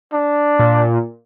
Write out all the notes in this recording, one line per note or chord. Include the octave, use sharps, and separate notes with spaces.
D4
A#2